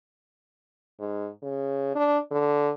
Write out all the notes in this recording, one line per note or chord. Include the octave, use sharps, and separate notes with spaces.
G#2
C#3
D4
D3